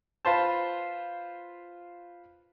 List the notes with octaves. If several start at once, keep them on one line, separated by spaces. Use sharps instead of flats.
F4 B4 C5 A5